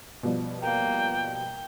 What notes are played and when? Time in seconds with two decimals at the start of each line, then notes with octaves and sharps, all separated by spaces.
0.23 B2 F3 G3
0.62 A#3 G5
1.34 G5